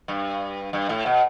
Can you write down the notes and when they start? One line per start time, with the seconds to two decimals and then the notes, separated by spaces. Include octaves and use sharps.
0.08 G2
0.73 G2
0.89 A2
1.06 B2